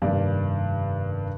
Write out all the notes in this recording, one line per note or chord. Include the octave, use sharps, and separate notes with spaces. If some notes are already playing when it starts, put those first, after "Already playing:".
F1 G2 D#3 A#3 G4 D5